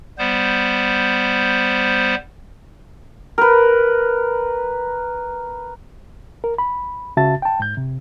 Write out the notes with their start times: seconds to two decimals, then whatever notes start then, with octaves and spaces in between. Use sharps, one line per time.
0.18 G3 B3 C5
3.38 A#4 B4
6.44 A#4
6.58 B5
7.17 C#2 C#3 F#4 E5 A5 A6
7.42 G5 A5
7.60 G#2 G6
7.77 C3